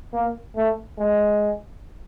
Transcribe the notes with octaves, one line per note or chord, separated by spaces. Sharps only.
A#3
A3
G#3